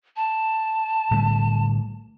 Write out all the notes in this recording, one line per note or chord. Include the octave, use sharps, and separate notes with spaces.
A5
A2 D3 G3